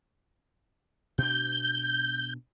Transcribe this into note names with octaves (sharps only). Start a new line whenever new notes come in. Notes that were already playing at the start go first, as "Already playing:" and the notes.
B2 D4 G6